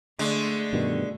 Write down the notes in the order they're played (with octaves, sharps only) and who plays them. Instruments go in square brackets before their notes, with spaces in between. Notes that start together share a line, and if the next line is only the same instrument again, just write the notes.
[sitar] D3 G#3 [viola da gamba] A3
[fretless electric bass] G2 B2 D#3